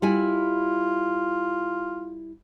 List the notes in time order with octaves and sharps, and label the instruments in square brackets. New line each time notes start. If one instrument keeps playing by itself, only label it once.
[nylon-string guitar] G3 E4 G#5 [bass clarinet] F4